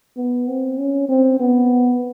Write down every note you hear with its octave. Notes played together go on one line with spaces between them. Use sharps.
B3
C4
C#4
C4
B3